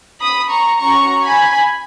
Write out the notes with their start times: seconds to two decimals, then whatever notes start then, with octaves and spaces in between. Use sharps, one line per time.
0.21 B5 D#6
0.50 A#5 C#6
0.79 C#4 F#4 A#5 C#6
1.24 G#5 B5